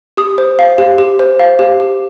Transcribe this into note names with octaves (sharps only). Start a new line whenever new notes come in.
G4 D#6
C5
F5
G4
G4
C5
F5
G4
G4